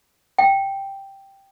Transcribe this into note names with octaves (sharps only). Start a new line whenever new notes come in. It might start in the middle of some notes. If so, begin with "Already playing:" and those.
G5